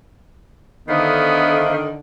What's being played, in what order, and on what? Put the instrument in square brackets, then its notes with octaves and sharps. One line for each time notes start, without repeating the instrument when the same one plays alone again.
[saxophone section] D3 D#3 [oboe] B3 [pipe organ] C5 E5 F5